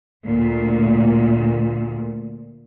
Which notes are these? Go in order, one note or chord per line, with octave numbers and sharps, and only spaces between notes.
D2 A#2